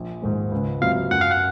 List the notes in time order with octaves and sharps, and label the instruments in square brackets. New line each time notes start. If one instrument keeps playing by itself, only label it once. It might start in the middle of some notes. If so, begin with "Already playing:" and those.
Already playing: [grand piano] A#1
G#2 D#3 G#3
C#2
[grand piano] C3 F#3 C4 F4 [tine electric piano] F5
[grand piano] F#2 [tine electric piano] F#5
[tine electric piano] F5
F#5